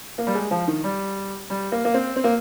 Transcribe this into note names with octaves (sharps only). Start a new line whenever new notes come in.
A#3
G3
G#3
F3
D#3
G3
G3
A#3
A#3
C4
C4
A#3